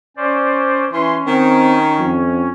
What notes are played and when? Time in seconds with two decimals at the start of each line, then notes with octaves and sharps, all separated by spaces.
0.17 C#4 C5 D5
0.93 E3 C#4 C6
1.27 D#3 C4 D#4
1.98 F2